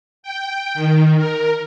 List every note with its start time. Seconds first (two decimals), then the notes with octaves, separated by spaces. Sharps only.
0.23 G5
0.74 D#3
1.17 A#4